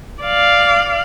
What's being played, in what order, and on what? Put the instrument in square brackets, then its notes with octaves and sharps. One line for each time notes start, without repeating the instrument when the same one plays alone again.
[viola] D5 F5